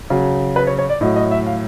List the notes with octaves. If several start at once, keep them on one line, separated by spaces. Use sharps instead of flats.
C#3 F#3
B4
C#5
C#5
D5
A2 F#3 D#5
D#5
E5
F5